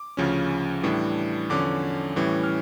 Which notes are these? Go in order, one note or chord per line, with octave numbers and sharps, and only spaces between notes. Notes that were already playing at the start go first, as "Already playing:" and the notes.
Already playing: D6
D2 C#3 F3 C#4
A2 E3 G3 D4
E2 D3 F3 C#4 D6
A2 E3 G3 C#4
F6